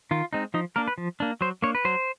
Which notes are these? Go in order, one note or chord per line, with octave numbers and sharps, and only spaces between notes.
D#3 F4
G#3 C4 D#4
F3 D#4
A#3 D4 A#4
B4
F3
A#3 D4
F#3 C5
A#3 D4 C#5
B4
F#3 C5